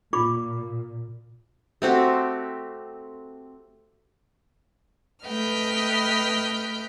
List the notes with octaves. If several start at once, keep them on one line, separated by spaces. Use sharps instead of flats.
A#2 F4 B5 D6
A3 C4 F#4 G4
A3 B4 D#5 G5 F6